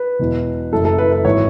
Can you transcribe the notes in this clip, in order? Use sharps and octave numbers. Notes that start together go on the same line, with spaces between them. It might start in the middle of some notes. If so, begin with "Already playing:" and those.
Already playing: B4
E1 E2 B2
F#1 F#2 E3 A4
A4
B4
B4
G#1 E3 C#5